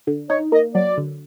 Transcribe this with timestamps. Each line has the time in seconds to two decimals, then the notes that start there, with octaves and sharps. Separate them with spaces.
0.07 D3
0.29 D#4 C#5
0.52 A#3 D#5
0.75 F#3 D5
0.98 D3